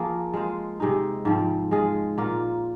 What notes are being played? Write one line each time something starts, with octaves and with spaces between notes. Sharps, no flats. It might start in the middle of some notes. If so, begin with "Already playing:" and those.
Already playing: F3 A#3 F4 G#4
G#3 F4 C5
C3 G#3 D#4
G#2 F3 C4
G#3 F4 G#4
A#2 A#3 F4